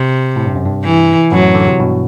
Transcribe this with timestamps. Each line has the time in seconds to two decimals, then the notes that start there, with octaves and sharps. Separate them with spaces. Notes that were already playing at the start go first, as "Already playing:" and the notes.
Already playing: C3
0.36 A2
0.46 G2
0.56 F#2
0.66 G2
0.84 E3
1.32 F#2 A2 F#3
1.55 D3
1.67 C3
1.79 G2 B2